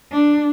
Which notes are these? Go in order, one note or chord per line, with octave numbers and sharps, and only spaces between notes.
D4